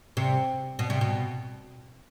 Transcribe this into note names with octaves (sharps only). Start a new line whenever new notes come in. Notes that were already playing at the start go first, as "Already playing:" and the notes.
C3
B2
C3
B2